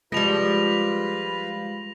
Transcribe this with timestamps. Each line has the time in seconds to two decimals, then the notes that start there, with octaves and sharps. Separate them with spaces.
0.12 F3 G3 G#3 F4 B4 B5 A#6 F7